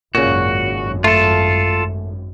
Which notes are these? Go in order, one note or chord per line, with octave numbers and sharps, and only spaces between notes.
G#1 F#2 A#2 C#3 F#4
A3 F4 A4